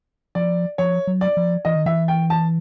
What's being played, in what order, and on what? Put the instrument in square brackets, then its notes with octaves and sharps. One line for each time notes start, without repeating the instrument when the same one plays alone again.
[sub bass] F3 [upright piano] D5
[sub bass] F3 [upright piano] C#5
[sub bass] F#3
[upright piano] D5
[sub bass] F3
[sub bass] E3 [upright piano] D#5
[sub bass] D#3
[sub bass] E3 [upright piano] E5
[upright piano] G5
A5